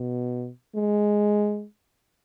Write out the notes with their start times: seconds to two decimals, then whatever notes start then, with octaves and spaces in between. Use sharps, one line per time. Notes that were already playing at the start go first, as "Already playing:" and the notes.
Already playing: B2
0.75 G#3